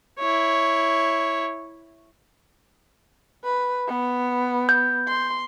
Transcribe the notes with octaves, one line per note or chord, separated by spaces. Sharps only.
E4 C#5
B4
B3
G6
C6